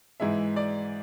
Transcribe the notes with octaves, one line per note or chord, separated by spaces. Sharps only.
G#2 E3 G#3 E5
D5